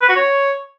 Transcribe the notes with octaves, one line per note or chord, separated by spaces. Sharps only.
B4
F#4
C#5